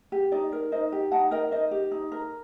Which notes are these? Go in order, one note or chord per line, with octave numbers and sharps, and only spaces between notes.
G4
D#4 D5
A#4
D#4 C5 D#5
G4
D#4 F#5 A5
A#4 D#5 G5
D#4 C5 D#5
G4
D#4
A#4